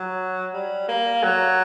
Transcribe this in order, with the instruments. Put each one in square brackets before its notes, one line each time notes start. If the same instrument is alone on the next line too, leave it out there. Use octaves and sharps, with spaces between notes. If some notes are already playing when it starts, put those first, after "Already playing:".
Already playing: [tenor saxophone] F#3
G3
A#3
F#3